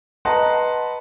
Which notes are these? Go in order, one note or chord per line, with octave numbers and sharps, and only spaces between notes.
B4 D#5 F#5 A5 A#5 C6